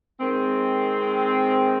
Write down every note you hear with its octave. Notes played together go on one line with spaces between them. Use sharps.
D#3 G#3 C4